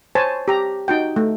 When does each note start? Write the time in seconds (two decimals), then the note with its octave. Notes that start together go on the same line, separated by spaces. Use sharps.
0.15 C5 C#5 G#5 A5
0.48 G4 A#5
0.88 D#4 F#4 G5
1.16 A3